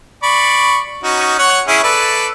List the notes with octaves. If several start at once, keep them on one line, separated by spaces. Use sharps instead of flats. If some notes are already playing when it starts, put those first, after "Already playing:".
D5 B5 C#6
C#4 D#4 F#4
C#5 F#5
C#4 E4 G#4
A4 B4 D5